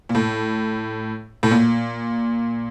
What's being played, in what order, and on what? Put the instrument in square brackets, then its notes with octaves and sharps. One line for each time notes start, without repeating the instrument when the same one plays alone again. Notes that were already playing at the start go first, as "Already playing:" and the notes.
[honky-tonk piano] A#2
A2
A2
A#2